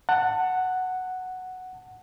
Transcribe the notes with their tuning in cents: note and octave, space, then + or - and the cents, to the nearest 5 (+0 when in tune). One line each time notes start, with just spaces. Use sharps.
F#5 +0 A5 +25